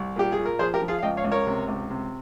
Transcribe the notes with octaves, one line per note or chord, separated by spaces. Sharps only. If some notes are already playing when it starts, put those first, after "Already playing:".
Already playing: C2
A#2 G4
G#4
A#2
A#4
F3 G#4 C5
G4 A#4
F3
F4 G#4
F5
C#2 D#5 G5
C#5 F5
C#2
A#4 C#5
C3
C#2
C3